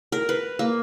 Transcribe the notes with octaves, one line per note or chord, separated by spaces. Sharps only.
A#4
B4
A#3